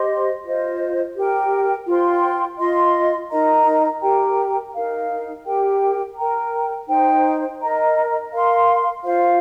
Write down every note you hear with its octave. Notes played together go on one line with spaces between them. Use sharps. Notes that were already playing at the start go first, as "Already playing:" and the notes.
Already playing: G4 C5 D#5 C6
F4 C5 D#5
G4 A#4 G5
F4 C5 G5 C6
F4 D#5 C6
D#4 A#4 D#5 A#5
G4 A#4 G5 A#5
D#4 A#4 F5
G4 A#4 G5
A#4 G5 A#5
D#4 C5 G5
A#4 D#5 A#5
A#4 F5 C6
F4 C5 F5